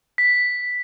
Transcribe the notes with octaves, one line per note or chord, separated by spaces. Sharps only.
B6